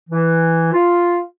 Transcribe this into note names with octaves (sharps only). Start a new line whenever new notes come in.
E3
F4